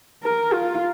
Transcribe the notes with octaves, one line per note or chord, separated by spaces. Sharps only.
A#4
F4